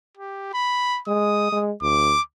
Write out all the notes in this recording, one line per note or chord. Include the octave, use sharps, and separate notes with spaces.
G4
B5
G#3 D#6
G#3
D2 D6